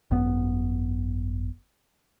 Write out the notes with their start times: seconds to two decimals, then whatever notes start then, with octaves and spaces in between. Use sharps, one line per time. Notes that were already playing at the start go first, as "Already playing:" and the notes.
0.11 G#1 F#2 B3